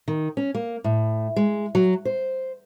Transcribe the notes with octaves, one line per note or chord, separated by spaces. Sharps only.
D#3
C#4
A#3
A2
G#3
F#3
C5